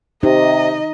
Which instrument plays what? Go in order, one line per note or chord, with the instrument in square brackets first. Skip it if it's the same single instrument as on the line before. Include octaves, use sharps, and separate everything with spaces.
[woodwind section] C3 [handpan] D#4 [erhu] D#5